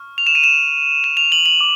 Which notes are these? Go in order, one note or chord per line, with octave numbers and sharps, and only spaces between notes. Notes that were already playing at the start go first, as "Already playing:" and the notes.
Already playing: C#6 F6
F7
E7
D#7
E7
E7
F7
F#7
F#7
D6